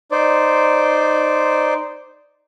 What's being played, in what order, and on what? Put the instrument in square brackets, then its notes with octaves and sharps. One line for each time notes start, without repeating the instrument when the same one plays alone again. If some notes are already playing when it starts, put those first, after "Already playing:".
[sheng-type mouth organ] D#4 C5 D5